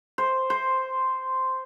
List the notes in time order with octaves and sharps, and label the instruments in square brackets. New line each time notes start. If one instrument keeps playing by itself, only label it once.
[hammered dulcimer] C5
C5